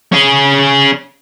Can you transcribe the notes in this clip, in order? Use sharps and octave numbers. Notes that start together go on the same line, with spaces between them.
C#4 G#4